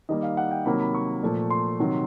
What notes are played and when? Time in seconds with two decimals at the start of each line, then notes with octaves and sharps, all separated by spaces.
0.09 D#3 G3 A#3 D#5
0.23 F5
0.37 F#5
0.51 G5
0.65 C3 D#3 F#3 A#3 B5
0.80 B5
0.95 C#6
1.23 A#2 F3 A3
1.50 C6
1.79 C3 D#3 F#3